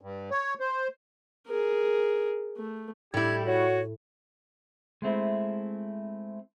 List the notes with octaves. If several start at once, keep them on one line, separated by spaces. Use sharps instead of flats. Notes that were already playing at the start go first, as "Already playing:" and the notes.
G2
C#5
C5
G#4 A#4
A3
A2 G3 E4 G4 G#6
F#4 C#5
G#3 A3 C4 E4